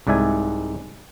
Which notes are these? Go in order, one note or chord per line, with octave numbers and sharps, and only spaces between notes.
C2 G#2 D5 E5 G#5